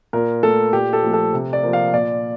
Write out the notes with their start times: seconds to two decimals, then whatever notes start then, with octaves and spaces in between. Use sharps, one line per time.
0.13 A#2 A#4
0.43 A3 A4
0.73 A#2 G4
0.93 A4
1.03 F3 A3
1.13 A4
1.33 C3
1.53 D5
1.63 F3 A#3
1.73 F5
1.93 A#2 D5